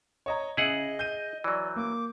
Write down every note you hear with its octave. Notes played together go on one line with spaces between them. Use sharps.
C#5 D#5 A#5
C#3 E4 G#4 D#5 F#5
G6 D#7
E3 F#3 D5
A#3 D6